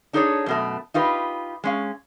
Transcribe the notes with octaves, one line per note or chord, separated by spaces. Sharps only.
D4 D#4 G#4 A4 C5 C#5
F#2 B2 A3
D#4 F4 G4 B4
G#3 C#4 F5